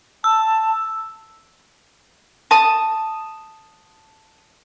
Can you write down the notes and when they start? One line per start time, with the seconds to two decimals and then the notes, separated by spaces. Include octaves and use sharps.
0.24 A5 E6
2.51 A5 D#6